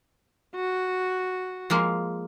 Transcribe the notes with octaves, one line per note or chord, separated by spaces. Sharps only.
F#4
F3 G#3 A#3